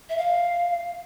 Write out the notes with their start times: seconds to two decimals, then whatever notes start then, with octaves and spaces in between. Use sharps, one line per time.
0.09 E5
0.18 F5